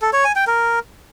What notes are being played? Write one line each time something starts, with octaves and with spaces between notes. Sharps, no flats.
A4
C#5
G#5
G5
A#4